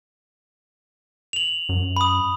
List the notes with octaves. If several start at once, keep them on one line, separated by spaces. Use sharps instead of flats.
F7 F#7
F#2
B5 D#6